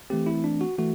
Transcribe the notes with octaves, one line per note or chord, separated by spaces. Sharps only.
E3 A3 C4 G4
E4
D4
F#4
E3 A3 F#4